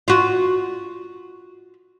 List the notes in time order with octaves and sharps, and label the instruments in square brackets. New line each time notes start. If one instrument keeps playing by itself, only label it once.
[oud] F4 F#4